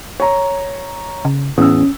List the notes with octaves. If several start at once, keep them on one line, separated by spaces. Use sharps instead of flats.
C#5 A#5
C#3
E2 A2 C#4 D#6 E6